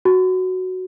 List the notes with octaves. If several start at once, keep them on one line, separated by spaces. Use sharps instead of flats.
F#4